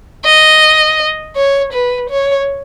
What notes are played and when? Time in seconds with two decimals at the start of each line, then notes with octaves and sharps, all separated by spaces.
0.25 D#5
1.36 C#5
1.73 B4
2.10 C#5